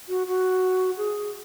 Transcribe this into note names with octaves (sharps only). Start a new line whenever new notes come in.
F#4
F#4
G#4